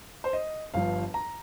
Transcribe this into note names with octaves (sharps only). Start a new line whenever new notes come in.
C5
D#5
G1 G2 F3 F5
A#5